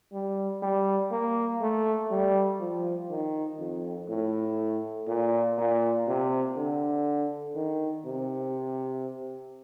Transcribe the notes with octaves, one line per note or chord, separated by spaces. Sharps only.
G3
G3
A#3
A3
G3
F3
D#3
F2
A2
A#2
A#2
C3
D3
D#3
C3